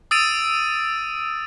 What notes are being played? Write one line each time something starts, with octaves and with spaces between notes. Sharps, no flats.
D#6 E6 A6 D7 D#7